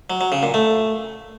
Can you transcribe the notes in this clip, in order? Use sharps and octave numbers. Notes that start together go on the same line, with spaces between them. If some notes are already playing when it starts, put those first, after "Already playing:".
F#3
F#3
C#3
A#2
A3